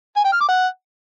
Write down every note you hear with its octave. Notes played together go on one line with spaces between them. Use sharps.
G#5
G5
F6
D6
F#5